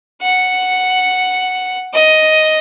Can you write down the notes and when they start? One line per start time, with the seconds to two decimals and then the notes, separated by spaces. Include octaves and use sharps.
0.22 F#5
1.94 D#5